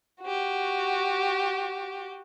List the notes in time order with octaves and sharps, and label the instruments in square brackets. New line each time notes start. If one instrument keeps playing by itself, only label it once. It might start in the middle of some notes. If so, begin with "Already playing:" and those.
[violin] F#4 G4